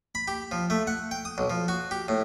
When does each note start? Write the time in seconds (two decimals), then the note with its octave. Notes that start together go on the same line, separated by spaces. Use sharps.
0.15 B5
0.28 G4
0.52 F3
0.70 A3
0.87 F#5
1.11 G5
1.25 D#6
1.38 B1
1.50 F3
1.68 F#4
1.91 G4
2.08 A2